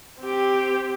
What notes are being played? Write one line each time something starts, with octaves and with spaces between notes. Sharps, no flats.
C4 G4